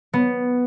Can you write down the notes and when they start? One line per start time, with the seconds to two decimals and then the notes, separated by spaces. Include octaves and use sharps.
0.13 B3